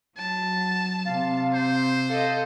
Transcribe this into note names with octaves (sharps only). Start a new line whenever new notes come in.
F#3 A5
C3 F5
C5
A4 D#5 F5